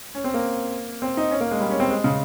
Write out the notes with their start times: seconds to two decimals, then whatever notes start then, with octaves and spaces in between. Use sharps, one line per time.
0.15 C#4
0.24 C4
0.34 A#3
1.02 C4
1.17 D#4
1.31 C#4
1.40 A#3
1.51 G#3
1.60 G3
1.70 C#4
1.80 C4
1.90 G#3
2.04 C#3